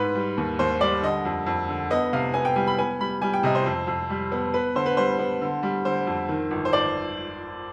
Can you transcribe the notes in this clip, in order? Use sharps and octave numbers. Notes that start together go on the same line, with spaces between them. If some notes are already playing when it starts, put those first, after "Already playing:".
Already playing: G#2 B4
G3
D#2
D#2 C5
G3 D5
D3 D#5
F2
F2
D3
B3 D#5
C3 F5
B3 G#5
G5
G3 G#5
B5
B3 G#5
G3 B5
G3 G#5
G5
C3 D#5
C5
F2
F2
G3
B3
B3 B4
D3 C5
B4
G3 C5
B3
D3
G3
D3 C5
F2
D#3
G1
C5
G1 D5